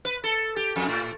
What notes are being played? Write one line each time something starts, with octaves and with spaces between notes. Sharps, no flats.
B4
A4
G4
F2
A2